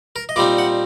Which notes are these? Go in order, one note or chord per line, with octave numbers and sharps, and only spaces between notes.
A#4
D#5
A#2 G3 C4 D#4 D5
F#5